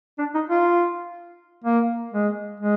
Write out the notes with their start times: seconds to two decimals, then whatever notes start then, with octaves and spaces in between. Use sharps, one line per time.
0.19 D4
0.34 D#4
0.50 F4
1.64 A#3
2.13 G#3
2.60 G#3